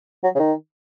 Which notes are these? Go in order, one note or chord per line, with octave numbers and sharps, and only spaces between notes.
F#3
C#3
D#3